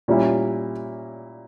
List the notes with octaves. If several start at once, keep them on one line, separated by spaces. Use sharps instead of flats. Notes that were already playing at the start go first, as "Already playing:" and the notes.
A#2 G3 C#4 E4